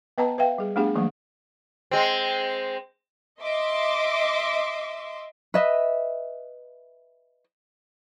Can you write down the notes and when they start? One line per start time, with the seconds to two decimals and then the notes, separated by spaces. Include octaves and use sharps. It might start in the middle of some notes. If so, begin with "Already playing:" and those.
0.18 B3 B4 D#5 F#5 A5 A#5
0.38 B4 E5 F5 G5
0.58 G3 G#4
0.76 A3 B3 D4 G4 G#4 F#5
0.95 E3 F#3 G3 A3 A#3
1.91 G#3 C4
3.43 D#5 E5 C6 D6
5.54 B4 D#5 E5